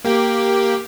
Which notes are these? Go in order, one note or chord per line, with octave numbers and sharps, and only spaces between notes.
A#3 G4